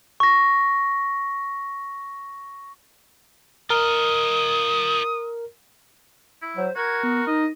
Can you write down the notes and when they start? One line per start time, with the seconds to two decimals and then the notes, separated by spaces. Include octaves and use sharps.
0.20 C#6 A#6
3.70 F4 A#4 D#5 D#6
6.42 E4
6.56 F#3 C5
6.76 F#4 A#4 G#6
7.03 B3
7.27 D#4 D#5